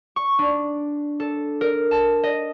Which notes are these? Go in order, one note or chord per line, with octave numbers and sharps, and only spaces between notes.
C#6
D4
A4
A#4
A5
D#5